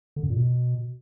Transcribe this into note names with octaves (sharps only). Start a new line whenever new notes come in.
D3
F#2
A#2
B2